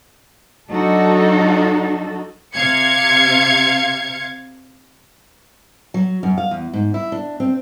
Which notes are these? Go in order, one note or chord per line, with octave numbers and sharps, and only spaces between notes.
F#3 D4 D#4 F#4 A4
C3 F5 G#6 C#7
F#3
F#2
F5
E2
G#2
E4
D4
C4